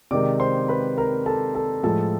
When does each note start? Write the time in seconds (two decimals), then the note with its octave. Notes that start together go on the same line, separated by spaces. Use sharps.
0.11 C3 D#3 G#3 D5 D6
0.40 C5 C6
0.68 B4 B5
0.98 A#4 A#5
1.26 A4 A5
1.55 A4 A5
1.83 A2 F3 G#3 A4 A5